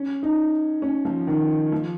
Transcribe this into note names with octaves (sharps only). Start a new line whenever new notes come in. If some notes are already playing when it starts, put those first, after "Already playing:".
Already playing: C#4
D#4
C#4
F3
D#3
F3